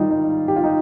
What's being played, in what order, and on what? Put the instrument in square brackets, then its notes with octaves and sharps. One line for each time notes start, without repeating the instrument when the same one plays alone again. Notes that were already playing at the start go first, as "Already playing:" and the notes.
Already playing: [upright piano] G#2 D#3 G3 D#4 F4
D#4
G4
F4
D#4